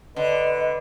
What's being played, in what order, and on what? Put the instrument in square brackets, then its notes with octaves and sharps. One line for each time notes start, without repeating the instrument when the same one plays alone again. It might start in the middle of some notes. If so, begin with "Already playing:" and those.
[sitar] D3 [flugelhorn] B4 [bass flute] D#5